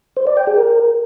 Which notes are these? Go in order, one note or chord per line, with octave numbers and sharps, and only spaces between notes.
C5
D5
G5
G#4
A#4